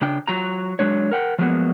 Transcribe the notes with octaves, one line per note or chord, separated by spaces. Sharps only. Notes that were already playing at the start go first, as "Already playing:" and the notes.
C#3 D4 G5
F#3 F4 A#5
F#3 G#3 D4 C#5
A#4 F#5 G5
F3 F#3 G#3 A#3 B3 F#4